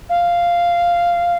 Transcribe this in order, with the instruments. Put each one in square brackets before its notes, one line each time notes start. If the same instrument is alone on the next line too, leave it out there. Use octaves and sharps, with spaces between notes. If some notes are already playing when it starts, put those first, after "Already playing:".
[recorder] F5